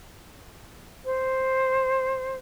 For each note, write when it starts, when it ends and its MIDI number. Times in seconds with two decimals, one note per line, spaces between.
1.05 2.36 72